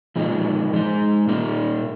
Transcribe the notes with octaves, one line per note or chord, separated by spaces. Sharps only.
A#2 F3 G#3 D#4
G#2 G#3 D#4
A#2 A#3 D#4